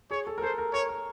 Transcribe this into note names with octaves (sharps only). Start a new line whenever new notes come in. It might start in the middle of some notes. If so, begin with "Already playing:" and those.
G#4 C#5
A4
A#4
A4 C5
A#4
A#4 C#5
A#4